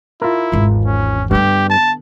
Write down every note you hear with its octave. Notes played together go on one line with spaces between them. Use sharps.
E4 F4 A#4
G#1 E2
C#4
G2 D3 B3 G4
A5